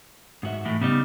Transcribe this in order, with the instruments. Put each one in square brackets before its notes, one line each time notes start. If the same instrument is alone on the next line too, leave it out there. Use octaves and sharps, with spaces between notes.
[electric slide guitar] G#2 F#4 E5
[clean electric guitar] A2 E3
[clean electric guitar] C#3 G3 D#4 [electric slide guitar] B3